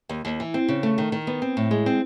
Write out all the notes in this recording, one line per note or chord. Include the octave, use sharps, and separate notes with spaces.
D#2
D#2
E3
C4
C#3
A3
D#3
D#3
B3
C4
A2
G#3
C4